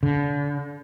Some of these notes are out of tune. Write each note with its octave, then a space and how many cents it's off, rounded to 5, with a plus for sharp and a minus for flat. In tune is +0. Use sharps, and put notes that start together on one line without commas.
D3 -35